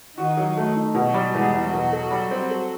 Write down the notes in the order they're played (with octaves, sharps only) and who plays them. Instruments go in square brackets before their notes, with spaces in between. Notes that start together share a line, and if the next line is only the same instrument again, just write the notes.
[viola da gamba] D#3 D#4 [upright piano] F#4
[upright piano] F#3
A3
D#4
B2
[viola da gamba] F#3 F#4
[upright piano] G3
[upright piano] E2 [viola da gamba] G#3 G#4
[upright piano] E2
[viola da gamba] F#3 F#4
[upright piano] B2
A4
G3
C4
A4